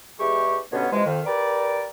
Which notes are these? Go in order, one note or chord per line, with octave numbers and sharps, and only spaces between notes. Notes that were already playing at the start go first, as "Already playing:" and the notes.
E2 G#3 E4 G4 C#6
G2 B2 D3 B3 C#4 C#5
C3 E3 F3 G#3
F2 D#3
G4 A#4 B4 D5